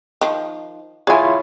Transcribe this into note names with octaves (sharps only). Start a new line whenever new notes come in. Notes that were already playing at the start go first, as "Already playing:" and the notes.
D#3 F3
E4 F4 G#4 C#5 G#5